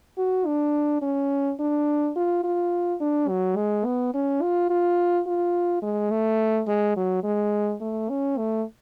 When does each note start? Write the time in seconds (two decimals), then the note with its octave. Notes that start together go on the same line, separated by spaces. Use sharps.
0.18 F#4
0.46 D4
1.02 C#4
1.60 D4
2.16 F4
2.44 F4
3.01 D4
3.29 F#3
3.57 G#3
3.85 B3
4.14 C#4
4.42 F4
4.70 F4
5.27 F4
5.83 G#3
6.11 A3
6.68 G#3
6.97 F#3
7.24 G#3
7.81 A3
8.10 C#4
8.38 A3